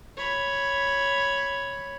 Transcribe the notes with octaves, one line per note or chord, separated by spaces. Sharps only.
C#5 B5